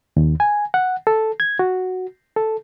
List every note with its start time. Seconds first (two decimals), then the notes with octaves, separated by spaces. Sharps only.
0.17 D#2
0.40 G#5
0.74 F#5
1.07 A4
1.40 G#6
1.59 F#4
2.36 A4